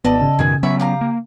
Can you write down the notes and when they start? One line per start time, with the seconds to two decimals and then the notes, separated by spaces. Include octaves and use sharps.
0.05 G#1 B3 A4 D5 D#5
0.21 C#3
0.39 F#2 B2 D#3 G#4 G#5
0.63 F#3 B3 C#4 C#5 E5 B5
0.80 G4 F5 A#5
1.01 A#3